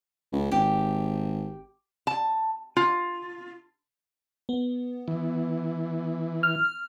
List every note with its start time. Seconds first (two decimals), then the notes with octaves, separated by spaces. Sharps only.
0.32 C#2
0.52 G#1 G4
2.07 A5
2.77 F4
4.49 B3
5.08 E3
6.43 F6